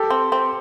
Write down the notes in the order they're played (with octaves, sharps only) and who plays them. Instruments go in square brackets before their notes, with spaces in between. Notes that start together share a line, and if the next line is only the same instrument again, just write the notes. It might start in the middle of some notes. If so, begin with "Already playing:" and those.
Already playing: [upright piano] G4 A4
[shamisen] C4
C4